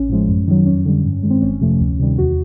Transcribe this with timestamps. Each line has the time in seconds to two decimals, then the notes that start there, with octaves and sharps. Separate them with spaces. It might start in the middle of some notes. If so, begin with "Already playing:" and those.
Already playing: A1 C#4
0.09 A2 F3 G#3
0.28 F#2
0.47 D#3 F#3
0.66 F2 C#4
0.85 D3 G3
1.05 G2
1.23 D#3 G#3
1.30 C4
1.42 G1 C#4
1.61 F2 C3 F3 A3
1.80 D2
1.99 C3 D#3 G3
2.18 E2 F#4